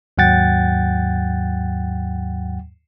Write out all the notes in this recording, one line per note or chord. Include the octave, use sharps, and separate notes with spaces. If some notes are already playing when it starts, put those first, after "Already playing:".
D#2 G#2 F#3 F#5 G5 A6